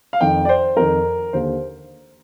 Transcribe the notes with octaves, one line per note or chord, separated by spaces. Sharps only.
F5
F2 D#3 G5
D5
C5
F2 D#3 A#4
D#2 D3 C5